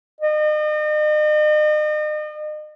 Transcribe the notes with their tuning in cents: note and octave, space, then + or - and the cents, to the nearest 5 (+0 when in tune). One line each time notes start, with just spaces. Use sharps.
D#5 -40